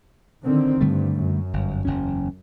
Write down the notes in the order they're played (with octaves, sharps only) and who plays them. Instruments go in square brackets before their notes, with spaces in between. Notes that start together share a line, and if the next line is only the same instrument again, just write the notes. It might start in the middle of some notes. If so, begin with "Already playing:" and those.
[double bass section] D3 D#3 C4
[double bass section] G2 [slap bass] D3 G3 A3
[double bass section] F#2
[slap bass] G1
F#1 E2 C#4